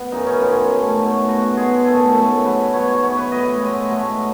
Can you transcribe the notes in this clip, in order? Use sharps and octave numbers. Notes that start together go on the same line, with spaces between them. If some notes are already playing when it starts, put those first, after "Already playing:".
Already playing: B3
F#2 C#3 E3 D#4
C#4
F#2 D#3 G#3 B3
C#3 F#3 A3
B2 F#3 A3
B2 F#3 B3 F#4
B2 G#3 B3 G#4
F#2 D#3 A3 A4
C#3 F#3 A3 A4
G#2 F#3 B3 B4
B2 F#3 B3 C#5
C#5
G#2 E3 B3 C#5
B4
A2 F#3 B3 D#5
A2 G#3 B3
G#2 F#3 A3